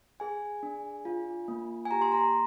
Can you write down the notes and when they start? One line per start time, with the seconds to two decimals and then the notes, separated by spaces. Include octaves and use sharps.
0.20 G#4 G#5
0.63 D4
1.05 F4
1.48 A#3
1.85 G#5
1.91 G4 A#5
2.02 C6
2.12 A#5